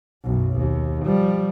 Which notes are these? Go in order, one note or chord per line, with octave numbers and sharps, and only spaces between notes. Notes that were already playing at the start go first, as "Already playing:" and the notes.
B1 F#2
D#2
F3 G3